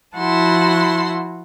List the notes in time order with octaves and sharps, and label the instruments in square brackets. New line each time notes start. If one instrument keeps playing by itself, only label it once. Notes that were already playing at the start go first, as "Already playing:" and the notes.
[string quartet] F3 E4 F#4 F#5 A5 C6